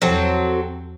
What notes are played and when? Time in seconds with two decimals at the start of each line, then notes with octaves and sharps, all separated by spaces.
0.02 E2 F3 F#3 C4 A4